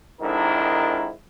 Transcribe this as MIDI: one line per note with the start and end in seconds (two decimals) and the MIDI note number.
0.21 1.11 41
0.21 1.11 44
0.21 1.11 51
0.21 1.11 62
0.21 1.11 64
0.21 1.11 70